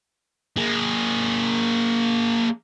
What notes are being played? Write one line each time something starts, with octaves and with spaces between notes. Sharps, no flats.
A#3 G#4